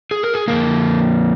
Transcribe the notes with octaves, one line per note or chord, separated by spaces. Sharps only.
G#4
A#4
G#4
F2 D#3 A#3 A#4